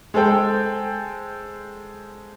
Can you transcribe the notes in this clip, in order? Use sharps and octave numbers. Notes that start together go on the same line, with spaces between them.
G#3 A4 C5 G5